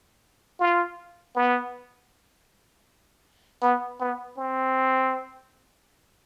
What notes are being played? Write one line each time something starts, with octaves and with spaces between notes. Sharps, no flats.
F4
B3
B3
B3
C4